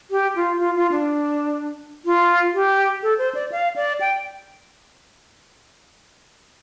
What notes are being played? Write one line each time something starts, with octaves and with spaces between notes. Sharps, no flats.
G4
F4
F4
F4
D4
F4
G4
A4
C5
D5
F5
D5
G5